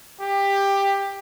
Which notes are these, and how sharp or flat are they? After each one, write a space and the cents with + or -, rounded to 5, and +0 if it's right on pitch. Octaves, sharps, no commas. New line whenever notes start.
G4 +15